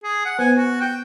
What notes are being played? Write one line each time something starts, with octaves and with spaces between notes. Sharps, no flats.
G#4
F#5
B3 B4 C5 G#5
F#4
G5